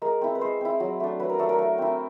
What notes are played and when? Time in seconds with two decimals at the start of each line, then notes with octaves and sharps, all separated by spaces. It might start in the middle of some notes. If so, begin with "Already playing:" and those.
0.02 G#3 A#4
0.21 C4 E4
0.35 B4
0.41 G#3 C5
0.61 C4 E4
0.80 F#3
1.00 A3 D4
1.20 F#3 B4
1.29 A#4
1.39 A3 D4 A4
1.49 A#4
1.59 A3
1.78 C4 E4